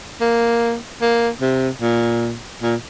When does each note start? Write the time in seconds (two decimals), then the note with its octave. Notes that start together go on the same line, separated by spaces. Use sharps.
0.21 A#3
1.01 A#3
1.41 C3
1.82 A#2
2.62 A#2